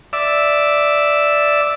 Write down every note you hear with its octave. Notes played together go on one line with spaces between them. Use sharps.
D5 E5